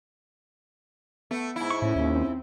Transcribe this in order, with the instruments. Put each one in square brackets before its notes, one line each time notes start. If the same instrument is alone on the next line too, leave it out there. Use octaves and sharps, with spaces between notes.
[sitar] A3 [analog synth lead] B3
[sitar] G#2 E4
[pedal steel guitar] C#6
[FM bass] A2 [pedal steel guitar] C#4 [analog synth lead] E5
[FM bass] D#2
[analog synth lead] C4